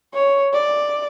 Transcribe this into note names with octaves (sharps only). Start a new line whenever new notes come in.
C#5
D5